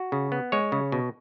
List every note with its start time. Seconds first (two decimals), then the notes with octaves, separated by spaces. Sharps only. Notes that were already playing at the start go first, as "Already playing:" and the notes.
Already playing: F#4
0.12 C#3
0.32 B3
0.52 G#3 C#5
0.72 C#3
0.92 B2